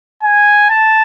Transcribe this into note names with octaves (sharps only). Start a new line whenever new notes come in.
G#5
A5